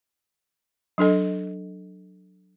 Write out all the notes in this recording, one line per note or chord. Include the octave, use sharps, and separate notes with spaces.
F#3 D4 A4 D#5